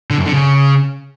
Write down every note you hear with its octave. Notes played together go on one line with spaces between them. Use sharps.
D3
F#2
D3
C#3